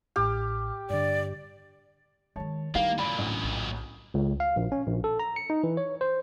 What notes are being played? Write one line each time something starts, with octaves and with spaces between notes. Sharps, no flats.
A1 A2 G4 F6
G2 D3 D5
D#3 G#3 C#5 A5
D#3 G3 A#3 E4 F5
F#2 A#2 D5 B5 D7
A1 D2
A#1
C#2
F5
A#1
C#4
A#1
A4
A#5
C#7
D#4
E3
C#5
C5